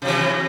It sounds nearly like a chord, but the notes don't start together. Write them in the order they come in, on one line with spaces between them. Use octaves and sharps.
C3 F#3 E3